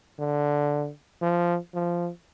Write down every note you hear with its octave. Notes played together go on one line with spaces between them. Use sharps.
D3
F3
F3